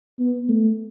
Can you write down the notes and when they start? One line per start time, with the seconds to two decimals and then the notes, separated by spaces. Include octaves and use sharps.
0.19 B3
0.49 A3